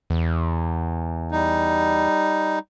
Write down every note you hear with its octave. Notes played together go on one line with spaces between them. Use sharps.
E2
G3 D#4